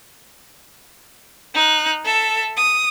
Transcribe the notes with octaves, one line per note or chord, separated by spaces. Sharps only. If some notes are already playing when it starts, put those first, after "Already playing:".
D#4 F#6
A4 E5
D#6